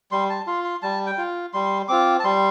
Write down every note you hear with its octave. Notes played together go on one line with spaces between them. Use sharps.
G3 C6
A5
F4 C6
C6
G3 A5
G5
F4
G3 C6
C4 F4 D6
A5
G3 C6